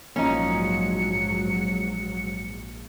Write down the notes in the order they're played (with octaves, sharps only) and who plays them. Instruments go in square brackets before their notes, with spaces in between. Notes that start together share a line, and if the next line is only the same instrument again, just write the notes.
[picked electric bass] A#1 F3 A#3 [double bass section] G#2 F#3 [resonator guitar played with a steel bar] C#4 D#4 [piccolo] C#7